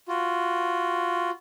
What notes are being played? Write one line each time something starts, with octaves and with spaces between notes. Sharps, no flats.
F4 F#4